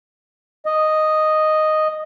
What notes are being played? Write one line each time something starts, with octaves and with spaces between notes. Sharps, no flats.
D#5